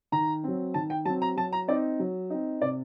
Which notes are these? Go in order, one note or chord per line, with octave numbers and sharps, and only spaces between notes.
D#3 A#5
F#3 C4
D#3 A5
G5
F#3 C4 A5
A#5
F#3 A5
A#5
C4 D#4 D5
F#3
C4 D#4
C3 D5